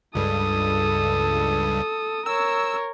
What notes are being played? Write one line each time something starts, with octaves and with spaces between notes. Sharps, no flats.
C#2 G2 A4 D#6
A#4 C#5 E6